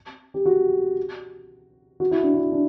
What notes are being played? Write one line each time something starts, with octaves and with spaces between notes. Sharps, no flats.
G4
F#4
F#4
E4
D4
E4
D4